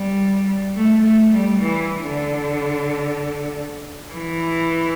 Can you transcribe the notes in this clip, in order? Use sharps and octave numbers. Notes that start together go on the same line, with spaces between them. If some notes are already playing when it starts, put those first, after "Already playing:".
Already playing: G3
A3
A3
G3
E3
D3
E3